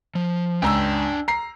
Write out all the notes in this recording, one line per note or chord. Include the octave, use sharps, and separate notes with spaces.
F3
C#2 D4 G5 A#5 E6
A#5 C7